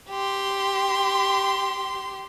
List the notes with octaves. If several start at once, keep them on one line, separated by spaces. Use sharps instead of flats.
G4 C6